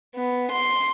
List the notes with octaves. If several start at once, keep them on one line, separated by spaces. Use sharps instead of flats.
B3
C6